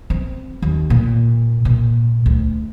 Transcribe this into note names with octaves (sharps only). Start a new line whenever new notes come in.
C4
D#2
A#2
A#2
D2